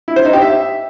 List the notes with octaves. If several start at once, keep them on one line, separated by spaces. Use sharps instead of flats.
E4
C5
D#4
G4
E5